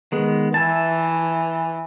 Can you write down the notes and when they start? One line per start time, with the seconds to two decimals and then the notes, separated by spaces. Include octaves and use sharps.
0.12 D#3 G#3 B3
0.54 E3 E5 G#5 A5